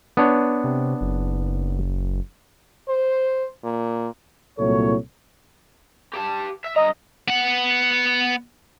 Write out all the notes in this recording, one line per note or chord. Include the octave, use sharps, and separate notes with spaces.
B3 D4 C#5
C3
F#1
C5
A#2
C2 A#2 F#3 E4 A4 C#5
G4 A5
E5
G2 D#5 A#5
B3 F#5